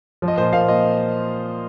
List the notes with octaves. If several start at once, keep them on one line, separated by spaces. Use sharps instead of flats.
F3
D#5
A#2 C5
A#2 F5
A#3 D#5